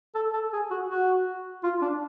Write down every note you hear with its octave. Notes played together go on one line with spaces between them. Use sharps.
A4
A4
G#4
F#4
F#4
F4
D4